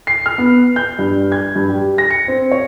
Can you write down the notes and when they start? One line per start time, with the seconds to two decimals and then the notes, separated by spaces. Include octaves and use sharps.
0.07 C7
0.26 F6
0.38 B3
0.76 G6
0.99 G2
1.32 G#6
1.56 G2
1.69 G4
1.98 A#6
2.10 C#7
2.28 C4
2.51 C#5